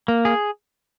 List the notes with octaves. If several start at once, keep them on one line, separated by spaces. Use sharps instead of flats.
A#3
G#4